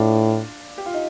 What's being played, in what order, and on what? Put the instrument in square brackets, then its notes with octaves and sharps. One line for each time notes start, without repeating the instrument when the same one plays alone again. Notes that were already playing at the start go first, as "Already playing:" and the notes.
Already playing: [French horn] A2 [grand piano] D4 F4
[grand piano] G4
F4
D#4